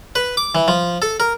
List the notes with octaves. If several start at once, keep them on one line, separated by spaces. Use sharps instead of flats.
B4
D6
E3
F3
A4
A#4